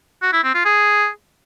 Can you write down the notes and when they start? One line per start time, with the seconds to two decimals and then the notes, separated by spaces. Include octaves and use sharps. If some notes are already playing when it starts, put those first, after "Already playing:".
0.22 F#4
0.33 E4
0.44 C4
0.54 F4
0.65 G#4